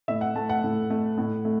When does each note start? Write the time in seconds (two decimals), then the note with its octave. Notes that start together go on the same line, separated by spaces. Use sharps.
0.08 A2 E5
0.21 F#5
0.35 A3 A5
0.49 F#5
0.63 A2
0.90 A3
1.18 A2
1.45 A3